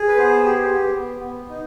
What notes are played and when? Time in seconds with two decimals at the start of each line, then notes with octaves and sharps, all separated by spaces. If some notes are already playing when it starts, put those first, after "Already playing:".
Already playing: G#4
0.08 B4
0.17 B3 C5
0.44 G4
0.71 B3
0.97 B3
1.23 B3
1.49 D#4